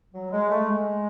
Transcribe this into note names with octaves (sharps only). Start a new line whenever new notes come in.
F#3
G#3
A3
G#3